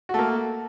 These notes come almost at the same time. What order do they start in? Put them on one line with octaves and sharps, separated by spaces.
F#4 A3 A#3